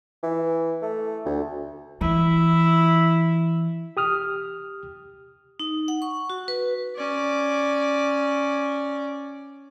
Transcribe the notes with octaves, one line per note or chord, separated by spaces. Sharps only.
E3
A3
D2
E3 E4
G4 D#6 F6
D#4
F#5
C#6
F#4
B4
C#4 D5